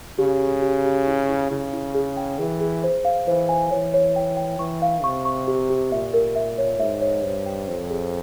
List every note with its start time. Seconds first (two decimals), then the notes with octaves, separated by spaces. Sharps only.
0.18 C#3 G4
0.41 G4
0.62 G4
0.85 G4
1.07 E4
1.29 E4
1.51 C#3 E4
1.73 E4
1.95 G#4
2.17 G5
2.39 E3 G#4
2.61 G#4
2.84 C5
3.05 F5
3.27 E3 C5
3.49 G#5
3.71 E3 C#5
3.94 C#5
4.16 G5
4.37 G5
4.59 E3 C#6
4.82 F5
5.03 C3 C#6
5.25 C#6
5.48 G4
5.70 G4
5.92 A#2 E5
6.14 A#4
6.36 E5
6.58 C#5
6.79 G#2 E5
7.02 C#5
7.23 G2 C5
7.46 G5
7.68 F2 C5
7.90 G#4